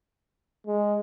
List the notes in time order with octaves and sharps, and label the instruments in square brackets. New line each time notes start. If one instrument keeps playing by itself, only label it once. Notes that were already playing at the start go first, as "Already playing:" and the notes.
[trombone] G#3